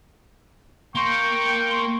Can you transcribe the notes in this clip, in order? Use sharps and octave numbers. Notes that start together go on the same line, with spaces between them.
A#3 G5 C6 C#6